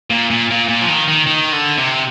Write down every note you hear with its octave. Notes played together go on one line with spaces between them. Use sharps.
A#2
A#2
A#2
A#2
F3
D#3
D#3
D#3
D3
C3